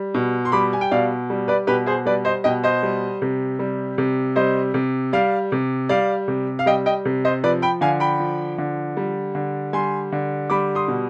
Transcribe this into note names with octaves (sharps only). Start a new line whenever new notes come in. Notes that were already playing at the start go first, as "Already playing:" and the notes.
Already playing: G3
B2
C6
G3 B5 D6
G#5
G5
B2 D5 F5
G3
B4 D5
B2 G4 B4
G#4 C5
G3 B4 D5
C5 D#5
B2 D#5 G5
C5 D#5
G3
C3
G3
C3
G3 C5 D#5
C3
G3 D5 F5
C3
G3 D5 F5
C3
F5
G3 D#5 G5
D#5 G5
C3
C5 D#5
F3 B4 D5
G5 B5
D3 F5 G#5
G5 B5
F3
D3
G3
D3
G3 G#5 C6
D3
G3 B5 D6
C6 D#6
B2